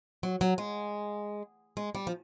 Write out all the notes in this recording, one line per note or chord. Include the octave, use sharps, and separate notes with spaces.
F#3
F#3
G#3
G#3
G3
F3